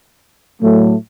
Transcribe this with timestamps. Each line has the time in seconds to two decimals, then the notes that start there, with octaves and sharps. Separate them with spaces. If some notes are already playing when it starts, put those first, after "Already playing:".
0.62 A2 F#3 A3